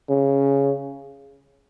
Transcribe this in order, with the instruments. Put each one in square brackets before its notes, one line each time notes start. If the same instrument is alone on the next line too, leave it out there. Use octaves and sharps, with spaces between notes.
[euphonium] C#3